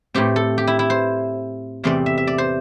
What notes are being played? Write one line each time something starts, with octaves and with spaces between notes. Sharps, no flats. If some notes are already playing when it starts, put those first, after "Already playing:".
A2 A3 C4 G4
A4
G4
E4
E4
C5
E2 C3 A3 C4 D5
E5
E5
D5
C5